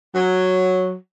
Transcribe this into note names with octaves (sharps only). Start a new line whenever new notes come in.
F#3